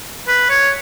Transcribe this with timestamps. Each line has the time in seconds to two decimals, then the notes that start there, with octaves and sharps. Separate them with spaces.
0.28 B4
0.50 C#5